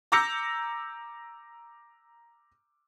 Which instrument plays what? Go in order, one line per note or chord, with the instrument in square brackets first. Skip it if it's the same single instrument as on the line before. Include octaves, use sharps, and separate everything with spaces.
[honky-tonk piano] A#5 D6 E6 G6 A#6 C#7